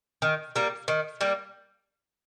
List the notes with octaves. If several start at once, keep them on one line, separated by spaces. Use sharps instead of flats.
D#3
G3 A#3
D#3
G3 A#3